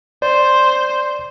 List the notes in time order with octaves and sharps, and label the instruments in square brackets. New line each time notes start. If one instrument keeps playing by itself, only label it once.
[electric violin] C5 [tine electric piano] D5